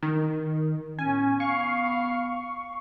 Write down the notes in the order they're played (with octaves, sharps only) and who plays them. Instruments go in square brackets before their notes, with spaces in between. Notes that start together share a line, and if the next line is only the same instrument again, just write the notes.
[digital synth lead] D#3
[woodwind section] A2 B3 C#4 [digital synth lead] G#5
[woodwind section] B3 F5 [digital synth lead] C#6